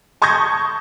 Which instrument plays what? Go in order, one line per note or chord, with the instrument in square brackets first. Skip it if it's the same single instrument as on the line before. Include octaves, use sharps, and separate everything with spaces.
[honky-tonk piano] A5 C#6 D#6 G6 G#6 A#6